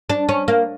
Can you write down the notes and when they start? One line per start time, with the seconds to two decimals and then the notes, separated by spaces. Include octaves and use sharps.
0.10 D4
0.29 C#4
0.48 A#3